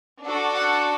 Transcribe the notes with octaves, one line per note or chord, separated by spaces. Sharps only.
D4 F#4 A4
F#5